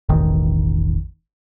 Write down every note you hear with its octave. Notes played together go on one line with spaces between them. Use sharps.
E1 A1 D#3